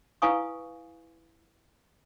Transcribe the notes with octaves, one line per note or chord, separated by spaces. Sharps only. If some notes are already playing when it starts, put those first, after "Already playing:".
E4 B4 F5 G#5 C#6 D#6